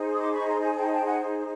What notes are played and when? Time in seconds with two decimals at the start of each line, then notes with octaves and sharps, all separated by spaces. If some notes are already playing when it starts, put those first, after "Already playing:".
Already playing: D#4 G#4 C5
0.14 D#6
0.17 C6 D6
0.32 B5 C#6
0.47 A#5 C6
0.61 G#5 A#5
0.76 G5 A5
0.91 G5 A5
1.05 F#5 G#5